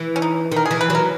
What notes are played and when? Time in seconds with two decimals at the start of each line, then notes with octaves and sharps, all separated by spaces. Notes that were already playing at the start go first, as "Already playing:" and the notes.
Already playing: E3
0.16 C#4
0.22 D#4
0.52 D#3 A#4
0.66 G#4
0.71 E3
0.81 B4
0.90 F#3 A#4